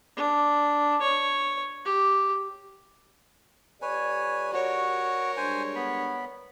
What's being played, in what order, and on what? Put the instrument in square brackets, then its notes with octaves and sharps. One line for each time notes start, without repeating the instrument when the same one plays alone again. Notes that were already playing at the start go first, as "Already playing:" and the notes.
[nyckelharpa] D4
C#5
G4
[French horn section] F2 G4 D5 [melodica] B4 C#5 G#5
[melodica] F#4 [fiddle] A#4 C#5
[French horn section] G3 G#3 D4 [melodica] C5 G#5
[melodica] B3 B5